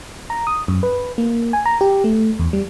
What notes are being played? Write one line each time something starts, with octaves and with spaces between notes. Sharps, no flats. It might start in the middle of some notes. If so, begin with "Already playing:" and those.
A#5
D#6
F#2
B4
A#3
G#5
A#5
G4
A3
E2
G3